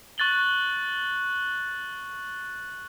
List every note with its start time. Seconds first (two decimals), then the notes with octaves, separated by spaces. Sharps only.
0.18 C#6 F#6 A6 F#7 G7